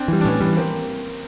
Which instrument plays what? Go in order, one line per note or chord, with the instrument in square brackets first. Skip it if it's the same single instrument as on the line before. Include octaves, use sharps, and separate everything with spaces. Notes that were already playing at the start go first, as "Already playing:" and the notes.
Already playing: [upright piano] C4 D4
[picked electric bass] E3 G3
[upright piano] D4
[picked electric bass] A2 [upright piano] B3 C#4
[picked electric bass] E3 G3
[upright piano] A#3 C4